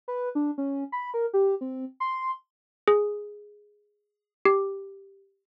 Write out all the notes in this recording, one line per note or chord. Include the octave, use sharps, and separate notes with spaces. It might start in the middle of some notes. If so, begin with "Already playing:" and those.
B4
D4
C#4
B5
A#4
G4
C4
C6
G#4
G4